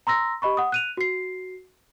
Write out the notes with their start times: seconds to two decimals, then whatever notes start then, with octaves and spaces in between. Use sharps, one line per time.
0.07 A#5 C6 E6 A#6
0.42 G4 D#5 B5 C#6
0.57 F#5 D#6
0.72 F#6 D#7 F7
0.97 F#4 C7